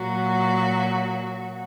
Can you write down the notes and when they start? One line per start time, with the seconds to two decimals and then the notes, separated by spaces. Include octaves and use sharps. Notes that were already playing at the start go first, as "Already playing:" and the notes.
Already playing: A#2 F#3 F#4